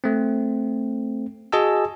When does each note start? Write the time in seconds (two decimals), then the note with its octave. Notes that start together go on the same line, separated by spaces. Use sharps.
0.04 A3 C4
1.52 F#4 G#4 D#5 G#5 A5 E6